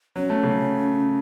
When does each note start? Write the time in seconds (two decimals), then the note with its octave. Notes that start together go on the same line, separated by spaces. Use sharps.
0.16 F#3 C#4
0.30 A3
0.43 C#3 F#3